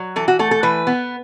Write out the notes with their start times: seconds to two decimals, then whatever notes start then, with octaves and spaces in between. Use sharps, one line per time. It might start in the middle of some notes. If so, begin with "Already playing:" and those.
Already playing: F#3
0.16 E3 A4
0.28 F#4
0.39 A3 A4
0.51 A4
0.63 E3 B4
0.87 B3